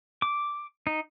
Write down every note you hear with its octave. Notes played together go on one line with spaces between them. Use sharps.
D6
D#4